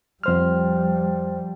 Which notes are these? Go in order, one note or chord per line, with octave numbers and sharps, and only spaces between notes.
F2 F3 G3 C5 F6